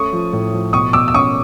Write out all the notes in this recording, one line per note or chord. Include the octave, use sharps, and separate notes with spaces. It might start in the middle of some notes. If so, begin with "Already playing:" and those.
Already playing: A3 C#4 C#6 D#6
F3
A2
F3
B2 C#6 D#6
B2 D6 E6
E6
C#4 C#6 D#6